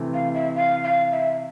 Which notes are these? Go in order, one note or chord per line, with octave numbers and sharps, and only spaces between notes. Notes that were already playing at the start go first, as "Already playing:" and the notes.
Already playing: C3 E3 A3
F5
E5
F5
F5
E5